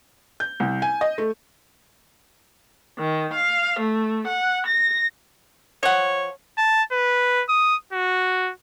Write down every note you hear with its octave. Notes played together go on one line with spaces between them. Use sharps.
G6
C2
G#5
D#5
A3
D#3
F5
A3
F#5
A#6
F3 C#5 F#5
A5
B4
D#6
F#4